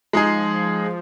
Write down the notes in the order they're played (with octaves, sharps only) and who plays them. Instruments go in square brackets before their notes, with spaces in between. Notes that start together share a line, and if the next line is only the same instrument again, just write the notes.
[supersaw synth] F3 [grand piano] G#3 D#4 G#4